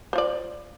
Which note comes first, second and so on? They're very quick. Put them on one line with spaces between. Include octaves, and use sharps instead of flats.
C5 F4 D5